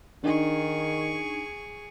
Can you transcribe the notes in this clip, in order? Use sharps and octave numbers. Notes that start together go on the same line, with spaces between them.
D#3 D4 D#4 G#4 C#6